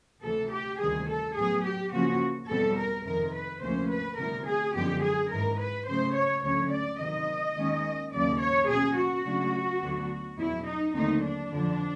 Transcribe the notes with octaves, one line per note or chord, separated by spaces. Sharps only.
D2 C3 E3 A4
G4
D2 C3 D#3 G3 G#4
A4
A2 F#3 B3 G#4
G4
C#3 F3 A#3 C#4 F#4
E2 B2 G3 C4 A4
A#4
F2 C3 D#3 A#4
B4
D2 C3 F3 A#3 C#4 C5
B4
D2 C3 E3 G3 B3 A#4
G#4
F#2 D3 F3 G#3 B3 G4
G#4
G#2 E3 G#3 A#4
B4
C#3 F#3 A3 C5
C#5
D2 D3 F#3 A3 C#4 C#5
D5
C3 D#3 F#3 D#5
D#2 D#3 G#3 C#4
D#2 C#3 F#3 D5
C#5
B2 F#3 A#3 C#4 G#4
F#4
C#3 F#3 A3 D4
D2 D3 F#3 B3 D4
E2 B2 F#3 E4
D#4
D#2 D3 F#3 A3 C4 D#4
D4
F2 D3 F3